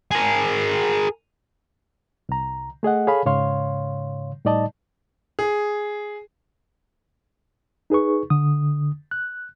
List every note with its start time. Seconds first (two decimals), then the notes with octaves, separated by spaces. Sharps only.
0.11 G#4 A#4
2.29 C2 A#5
2.83 A3 G#4 D#5 F#5
3.07 G#4 A4 C#5 F5 G#5 B5
3.26 G#2 C#3 C#5 F5 C6
4.45 A2 G3 D#4 D5 D#5 A5
5.39 G#4
7.90 D#4 G#4 B4 C#6
8.30 D3 D#6
9.11 F#6